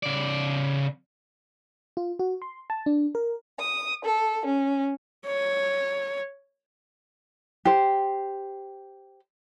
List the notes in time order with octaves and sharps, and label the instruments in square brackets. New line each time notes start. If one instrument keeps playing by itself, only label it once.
[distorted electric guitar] C#3 D5
[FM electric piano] F4
F#4
C6
A5
D4
A#4
[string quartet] D#6
A4
C#4
[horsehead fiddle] C#5
[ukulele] G4 C5